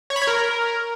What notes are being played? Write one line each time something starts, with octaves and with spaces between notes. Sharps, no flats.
C#5
B5
C#5
A#4